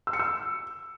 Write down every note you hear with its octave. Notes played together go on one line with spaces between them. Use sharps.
E6
C#7
E6